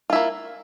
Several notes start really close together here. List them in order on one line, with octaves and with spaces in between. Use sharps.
F4 E4 A#3